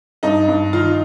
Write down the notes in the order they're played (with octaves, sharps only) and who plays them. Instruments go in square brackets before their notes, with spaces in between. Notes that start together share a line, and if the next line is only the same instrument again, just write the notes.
[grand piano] G2 [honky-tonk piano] D#4
[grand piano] G2
[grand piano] D#3 [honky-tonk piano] F4